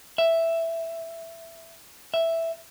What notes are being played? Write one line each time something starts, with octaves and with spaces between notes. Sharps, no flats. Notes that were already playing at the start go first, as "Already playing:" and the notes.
E5
E5